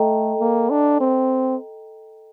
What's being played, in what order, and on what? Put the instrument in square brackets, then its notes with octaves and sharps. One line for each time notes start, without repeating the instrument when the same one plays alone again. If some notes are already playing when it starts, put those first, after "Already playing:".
Already playing: [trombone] A3 [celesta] A4 D#5 G5 A#5
[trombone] A#3
D4
C4